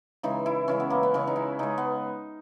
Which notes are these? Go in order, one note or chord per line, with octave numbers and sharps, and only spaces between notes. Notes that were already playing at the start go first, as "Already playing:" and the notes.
C#3 E3 G#3 D#4
E4
C#3 E3 G#3 C#4
B3
A#3
B3
C#3 G#3 C#4
D#4
E4
C#3 G#3 D#4
B3